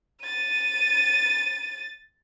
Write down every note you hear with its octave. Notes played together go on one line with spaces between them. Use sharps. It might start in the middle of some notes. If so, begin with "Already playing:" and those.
A6 D#7